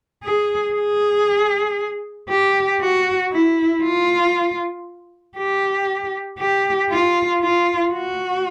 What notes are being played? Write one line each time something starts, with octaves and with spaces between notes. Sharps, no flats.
G#4
G#4
G4
F#4
E4
F4
G4
G4
F4
F4
F#4